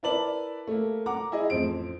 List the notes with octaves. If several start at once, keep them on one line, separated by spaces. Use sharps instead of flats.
E4 A#4 B4 D5 A5 F#7
A3 A#3
F#5 A#5 D6
E4 G#4 D#5
A1 F2 C5 D7